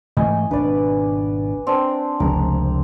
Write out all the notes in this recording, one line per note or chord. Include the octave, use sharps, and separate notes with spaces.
G#2 E3 A3 D#5 G#5
G#1 B2 D4 B4 D5
C4 D4
F1 C#2 G#3 A#4